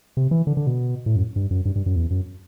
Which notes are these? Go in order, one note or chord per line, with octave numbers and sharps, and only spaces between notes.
C3
E3
D3
D3
B2
A2
F#2
G2
F#2
G2
G2
F#2
E2
F#2